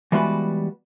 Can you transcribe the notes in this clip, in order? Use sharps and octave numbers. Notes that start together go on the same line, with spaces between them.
E3 G3 G#3 B3 F#4 B4